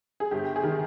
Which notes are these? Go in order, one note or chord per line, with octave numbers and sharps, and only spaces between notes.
G#4
G1 G4
G#4
D#3